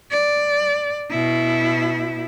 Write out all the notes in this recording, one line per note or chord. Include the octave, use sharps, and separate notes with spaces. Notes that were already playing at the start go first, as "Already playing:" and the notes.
D5
B2 E4